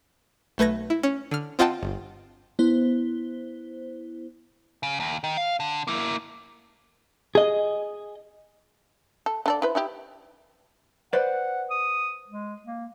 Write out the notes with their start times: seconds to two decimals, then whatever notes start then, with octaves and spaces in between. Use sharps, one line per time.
0.58 B1 A3 B4 G#6 A#6
0.90 E4
1.03 C#4
1.31 D3 F6
1.59 C4 F4 D#5 F#5 G5 A5
1.83 G1
2.59 B3 E4 C5
4.83 C#3
5.00 D#2
5.24 D#3
5.37 F5
5.60 D3
5.87 A#3 E4
7.35 G#4 D#5
9.26 A4
9.46 D3 A4 D5
9.62 E4 B4 C5
9.75 D#4 E4 G4
11.13 B4 C5 D5 F#5
11.71 D#6
12.29 G#3
12.66 A#3